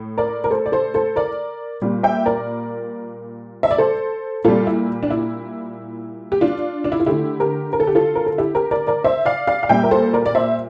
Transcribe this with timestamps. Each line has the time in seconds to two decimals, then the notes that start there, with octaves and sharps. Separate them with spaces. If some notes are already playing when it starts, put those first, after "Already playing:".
Already playing: A2
0.17 A#4 D5
0.44 A#4
0.51 A4 C5
0.66 D5
0.72 A4 C5
0.94 A4 C5
1.16 A#4 D5
1.82 A#2 G3
2.03 E5 G5
2.26 A#4 D5
3.63 E5
3.71 D5
3.78 A4 C5
4.44 A#2 G3 F4 A4
4.67 E4
5.03 D4
5.10 E4
6.32 G4
6.41 D4 F4
6.84 D4
6.92 E4
7.00 F4
7.06 D3 A3 E4 G4
7.40 G4 A#4
7.73 A#4
7.80 A4
7.87 G4
7.95 F4 A4
8.15 A#4
8.26 A4
8.38 E4 G4
8.55 G4 A#4
8.71 A#4 D5
8.87 A#4 D5
9.04 C5 E5
9.25 D5 F5
9.47 D5 F5
9.63 F5
9.69 A#2 G3 E5 G5
9.84 A#4
9.91 A4 C5
10.13 A#4 D5
10.26 D5
10.35 C5 E5